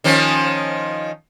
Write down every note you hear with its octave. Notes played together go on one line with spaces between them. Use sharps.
D#3 F3 C#4